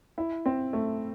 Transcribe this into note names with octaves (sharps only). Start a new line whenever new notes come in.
E4
C4
A3